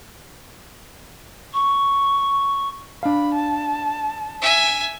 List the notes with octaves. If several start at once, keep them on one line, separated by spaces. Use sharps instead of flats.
C#6
D4 F5 B5
A5
E5 G#5